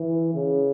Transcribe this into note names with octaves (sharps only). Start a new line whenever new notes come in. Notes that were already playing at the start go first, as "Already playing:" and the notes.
Already playing: E3
C#3